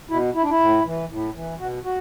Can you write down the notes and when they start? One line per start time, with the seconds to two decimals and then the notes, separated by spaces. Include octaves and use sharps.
0.10 B2 E4
0.35 E4
0.42 D4
0.50 E4
0.60 A2
0.85 E3
1.10 A2
1.35 E3
1.59 B2 F#4
1.85 F#4